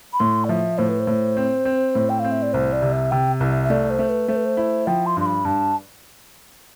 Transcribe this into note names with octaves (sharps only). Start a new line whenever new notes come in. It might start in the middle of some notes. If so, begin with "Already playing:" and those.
B5
A2 C6
D5
F3 E5
A2 C5
B4
C5
A2
C4
C4
A2
G5
C4 F5
E5
D5
C2 C5
D5
C3
E5
C3 G5
C2
E5
E5
A3 D5
C5
A3
B4
A3 C5
B4
C5
E4
F3 G5
C6
G2 C6
B5
G2 A5